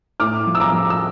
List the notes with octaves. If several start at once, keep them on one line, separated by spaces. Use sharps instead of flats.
A2 D6 F6
F3
E6
A#5 D6
F3
E6